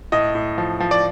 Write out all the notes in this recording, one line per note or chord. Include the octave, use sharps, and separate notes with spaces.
A2 D#5
A2
F3
F3
D5